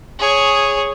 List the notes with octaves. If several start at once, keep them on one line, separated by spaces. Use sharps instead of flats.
G#4 C#5